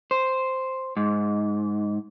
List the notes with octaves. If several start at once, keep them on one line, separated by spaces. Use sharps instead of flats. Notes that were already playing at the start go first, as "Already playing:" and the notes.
C5
G#2